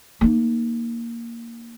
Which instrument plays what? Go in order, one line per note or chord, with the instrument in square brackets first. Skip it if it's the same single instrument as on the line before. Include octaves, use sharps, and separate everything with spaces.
[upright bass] A#3 D#4